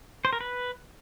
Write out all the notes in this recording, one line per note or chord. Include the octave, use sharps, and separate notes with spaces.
C5
A#4
B4